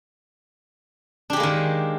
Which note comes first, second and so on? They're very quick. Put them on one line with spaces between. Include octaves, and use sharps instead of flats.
D4 G4 G#3 A#3 D#3